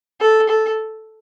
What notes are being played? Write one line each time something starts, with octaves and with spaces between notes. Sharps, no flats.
A4
A4